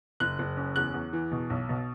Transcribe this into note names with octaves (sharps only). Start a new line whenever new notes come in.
F#1 F#6
F#1
F#2
E2 F#6
E2
E3
B2
B1
B2